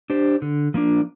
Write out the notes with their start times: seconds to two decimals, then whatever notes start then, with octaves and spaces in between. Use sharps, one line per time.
0.10 D4 G4 C5
0.42 D3
0.74 F3 A#3 D4